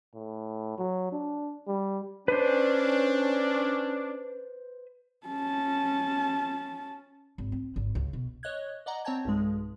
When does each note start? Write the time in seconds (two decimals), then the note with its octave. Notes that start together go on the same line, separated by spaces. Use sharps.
0.15 A2
0.78 F#3
1.12 D4
1.67 G3
2.28 C#4 D4 B4 C5
5.27 C#4 A5
7.38 G#1
7.52 C4
7.76 G#1
7.95 C#2
8.13 B2
8.43 C#5 D#5 F#6 G#6
8.86 D5 D#5 F#5 A#5
9.05 C4 C#5 G5 A5 G#6
9.25 B1 G2 G#3